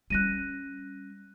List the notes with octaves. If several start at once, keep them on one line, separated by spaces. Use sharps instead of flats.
G3 C#4 F#6 A#6 D#7